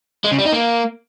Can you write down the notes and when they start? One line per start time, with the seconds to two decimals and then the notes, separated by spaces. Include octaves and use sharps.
0.24 G#3
0.31 C#3
0.38 G3
0.45 D#4
0.52 A#3